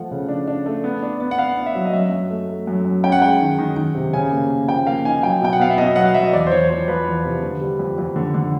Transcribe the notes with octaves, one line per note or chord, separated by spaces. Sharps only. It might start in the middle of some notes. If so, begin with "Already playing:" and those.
Already playing: F3 A3 F#5
C#3
D4
D4
A3
B3
D4
B3
F#5
B3 F5
D4
E5
F#3
D#5
F#2 E5
F#2
A3
A3
F#2
F#2
C#4 G5
F#5
G#3 G5
D#3
D#3
D#3
C3
C#3 G#5
A#3
A#3
F3 G5
A#3 F5
D#4 G#5
F#3 G5
B2 G5
F#5
B3 F5
E5
B2 D#5
F#3 F#5
F5
F#3 E5
D#5
E2 D5
C5
E2 C#5
F3 C5
F3 B4
E2
C3
D3
G3
F2
F2
D3
D3